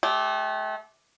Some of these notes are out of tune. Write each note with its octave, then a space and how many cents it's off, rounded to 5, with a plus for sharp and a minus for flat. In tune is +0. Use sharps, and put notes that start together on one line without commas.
A3 -35 G4 +0